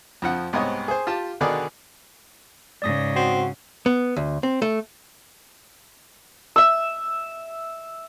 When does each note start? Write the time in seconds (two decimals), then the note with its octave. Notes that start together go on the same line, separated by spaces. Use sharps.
0.22 F2 F3 F#5
0.53 C2 G#2 B3 C#5 D#5
0.88 G#4 C5
1.07 F4 G4 A5
1.41 B2 D3 D#3 B3 G#4 D5
2.82 G#2 C#3 D5 D#6 A#6
3.16 C4 F#4
3.86 B3
4.17 D2
4.43 C4
4.62 A3
6.56 E5 E6